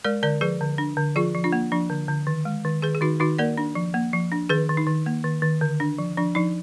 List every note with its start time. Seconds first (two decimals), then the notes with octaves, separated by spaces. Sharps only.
0.04 G#3 A#4 D5
0.23 D3 A#4 D5
0.41 F3 G#4 B4
0.61 D3
0.78 D4
0.97 D3
1.16 F3 F4 G#4
1.34 F3
1.44 D4 F4
1.52 A#3
1.72 F3 D4
1.90 D3
2.08 D3
2.27 D#3
2.45 G#3
2.65 D#3
2.82 D#3 G#4 B4
2.95 G#4
3.01 D#3 D#4 F#4
3.20 D#3 D#4 F#4
3.38 A#3 A#4 D5
3.58 D4
3.75 F3
3.94 A#3
4.13 F3
4.32 D4
4.49 D#3 G#4 B4
4.69 D#3
4.77 D#4
4.87 D#3
5.06 A#3
5.24 D#3
5.42 D#3
5.61 D3
5.80 D4
5.99 F3
6.17 F3 D4
6.35 F3 D#4